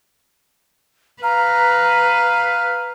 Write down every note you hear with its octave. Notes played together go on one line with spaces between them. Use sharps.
B4 F5 A#5